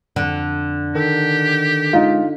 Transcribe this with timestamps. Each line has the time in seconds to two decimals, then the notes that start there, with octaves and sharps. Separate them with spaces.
0.16 F2 D3
0.95 D#3 G4 A4
1.93 G#3 D#4 F4